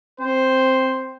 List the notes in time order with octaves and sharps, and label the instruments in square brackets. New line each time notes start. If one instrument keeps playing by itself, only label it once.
[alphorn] C4 [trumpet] C5